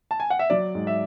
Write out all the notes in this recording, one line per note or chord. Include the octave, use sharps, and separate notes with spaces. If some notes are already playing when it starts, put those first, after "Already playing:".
A5
G#5
F#5
E5
F#3 D5
G#2
E5